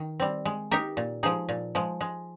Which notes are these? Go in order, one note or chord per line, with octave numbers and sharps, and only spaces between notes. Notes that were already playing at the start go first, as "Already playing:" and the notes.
Already playing: D#3
G3 C4
G#3
D#4 G4 A#4
A#2
F3 G#3 D#4 G#4
A#2
F3 G#3
G#3